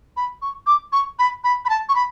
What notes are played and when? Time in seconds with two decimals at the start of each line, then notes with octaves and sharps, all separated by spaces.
0.17 B5
0.42 C#6
0.67 D6
0.93 C#6
1.19 B5
1.44 B5
1.65 B5
1.70 A5
1.89 C#6
1.95 B5